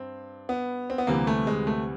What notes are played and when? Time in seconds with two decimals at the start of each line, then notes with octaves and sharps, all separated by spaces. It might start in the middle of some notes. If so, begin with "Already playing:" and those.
Already playing: G2 C4
0.49 B3
0.90 C4
0.98 B3
1.07 D2 C3 E3 G3 A#3
1.27 A3
1.47 G#3
1.67 A3